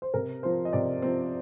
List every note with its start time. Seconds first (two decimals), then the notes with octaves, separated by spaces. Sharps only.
0.02 C5
0.14 C3 A#4
0.43 F3 C4 C5
0.65 D#5
0.73 C3 D5
1.02 F3 C4